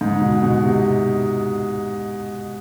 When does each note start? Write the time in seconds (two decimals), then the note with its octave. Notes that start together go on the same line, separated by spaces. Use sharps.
0.01 G#2
0.21 B2
0.43 B2
0.63 C3